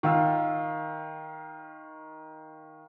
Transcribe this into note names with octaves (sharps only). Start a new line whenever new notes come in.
D#3 F4 E6